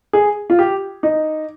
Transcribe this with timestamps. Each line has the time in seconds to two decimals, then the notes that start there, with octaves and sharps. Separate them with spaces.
0.13 G#4
0.50 F4
0.59 G4
1.03 D#4